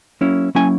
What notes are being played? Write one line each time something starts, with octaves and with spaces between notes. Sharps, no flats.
F#3 A#3 C#4 E4
F#3 A#3 C#4 E4 G#5